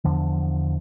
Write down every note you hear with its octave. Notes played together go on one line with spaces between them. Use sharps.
E2 D3 F3